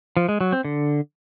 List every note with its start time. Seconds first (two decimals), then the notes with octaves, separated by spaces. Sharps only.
0.17 F3
0.29 G#3
0.41 F#3
0.53 C4
0.65 D3